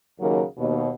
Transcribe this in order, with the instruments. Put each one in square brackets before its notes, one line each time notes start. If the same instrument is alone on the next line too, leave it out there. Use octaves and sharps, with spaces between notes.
[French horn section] D#2 C#3 F#3 A#4
D#2 B2